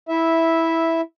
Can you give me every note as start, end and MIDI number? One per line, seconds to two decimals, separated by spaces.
0.09 1.01 64
0.09 1.01 76